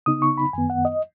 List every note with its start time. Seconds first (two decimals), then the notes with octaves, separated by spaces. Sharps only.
0.06 C#3 B3 D#4 D#6
0.22 C#6
0.38 B5
0.53 F#2 D#3 B3 G#5
0.70 F#5
0.85 D#5